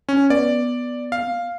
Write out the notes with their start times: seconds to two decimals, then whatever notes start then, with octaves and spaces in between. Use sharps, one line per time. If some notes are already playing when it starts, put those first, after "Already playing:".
0.09 C#4
0.30 B3 D5
1.12 F5